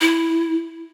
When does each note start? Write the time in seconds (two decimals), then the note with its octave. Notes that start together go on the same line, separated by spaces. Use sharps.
0.01 E4